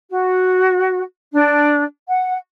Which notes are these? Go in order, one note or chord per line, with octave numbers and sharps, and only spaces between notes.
F#4
D4
F#5